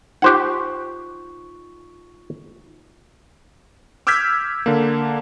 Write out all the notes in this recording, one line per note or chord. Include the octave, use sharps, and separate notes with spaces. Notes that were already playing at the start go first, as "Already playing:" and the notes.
D#4 F4 G4 C5 F#5 C#6
D6 E6 F6 G6 G#6 B6
D3 A#3